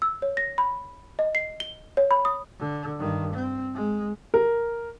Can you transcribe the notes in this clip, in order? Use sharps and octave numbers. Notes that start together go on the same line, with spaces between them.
E6
C#5
A#6
B5
D#5
C7
G7
C#5
B5
D#6
D3
G2 D#3
C4
G#3
A#4